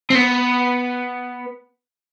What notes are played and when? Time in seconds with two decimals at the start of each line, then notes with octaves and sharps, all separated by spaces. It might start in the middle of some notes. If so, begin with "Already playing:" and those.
0.10 C4
0.15 B3